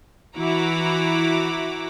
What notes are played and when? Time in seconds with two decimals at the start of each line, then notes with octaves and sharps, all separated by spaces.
0.38 E3 E4 F#4 A#5 B5 D6